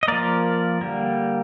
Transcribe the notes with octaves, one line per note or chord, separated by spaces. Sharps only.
D#5
F3 A#3 A#4 D5
D3 G3 A#3